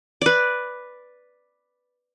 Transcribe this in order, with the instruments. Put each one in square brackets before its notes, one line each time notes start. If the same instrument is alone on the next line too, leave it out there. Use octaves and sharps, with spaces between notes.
[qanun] B4 D5